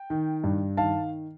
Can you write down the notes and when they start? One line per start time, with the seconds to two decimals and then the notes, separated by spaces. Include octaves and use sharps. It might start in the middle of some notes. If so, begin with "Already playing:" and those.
Already playing: G5
0.10 D#3
0.44 G2
0.77 D#3 F5 A5